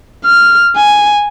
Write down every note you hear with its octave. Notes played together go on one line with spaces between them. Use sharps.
F6
G#5